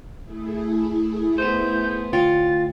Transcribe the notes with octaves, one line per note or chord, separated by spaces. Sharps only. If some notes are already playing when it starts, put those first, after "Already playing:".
A3 E4 G#4
B3 D#4 C5 G6
D2 F4 C#5 G5 A6